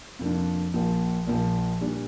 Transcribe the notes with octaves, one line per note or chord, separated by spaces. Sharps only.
F2 C3 F3 A#3 D4
A#1 A#2 F3 A#3
A#1 A#2 F3 A#3
A#2 G3 D4